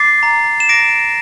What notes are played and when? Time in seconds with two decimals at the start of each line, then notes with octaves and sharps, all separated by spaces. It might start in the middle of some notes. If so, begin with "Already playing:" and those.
Already playing: D6 A6 C7
0.23 A#5
0.60 E7
0.69 D6 A#6 D7